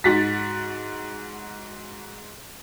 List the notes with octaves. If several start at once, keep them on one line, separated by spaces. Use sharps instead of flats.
G#2 F#4 A6 B6